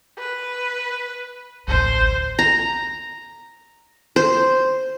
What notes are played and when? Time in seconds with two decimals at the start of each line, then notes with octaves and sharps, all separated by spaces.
0.18 B4
1.68 A1 D2 C5
2.39 A#5
4.16 C5